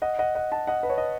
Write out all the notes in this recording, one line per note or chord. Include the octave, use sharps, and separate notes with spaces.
D#5 F#5
D#5 F#5
D#5 F#5
F#5 A5
D#5 F#5
B4
C#5
D#5